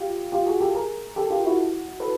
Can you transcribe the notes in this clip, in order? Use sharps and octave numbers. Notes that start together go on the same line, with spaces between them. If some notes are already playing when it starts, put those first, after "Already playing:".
Already playing: F4 G4
F4 G4
F#4 G#4
G4 A4
G#4 A#4
G4 A4
F4 G4
E4 F#4
A4 B4